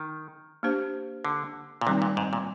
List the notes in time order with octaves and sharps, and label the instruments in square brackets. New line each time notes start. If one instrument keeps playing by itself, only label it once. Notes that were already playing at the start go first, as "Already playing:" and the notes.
Already playing: [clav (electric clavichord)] D#3
[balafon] A#3 D4 G4 C5
[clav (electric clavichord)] D3
A#2
[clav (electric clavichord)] C3 [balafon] D#3 G3 C4 D#4
[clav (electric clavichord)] A#2
G#2
A#2